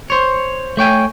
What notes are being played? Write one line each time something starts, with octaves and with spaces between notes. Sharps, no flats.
C5 C#5
A3 C#5 G5 G#5